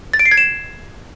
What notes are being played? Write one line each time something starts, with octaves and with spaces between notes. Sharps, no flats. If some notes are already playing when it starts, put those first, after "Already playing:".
A6
D7
C7
G#6
E7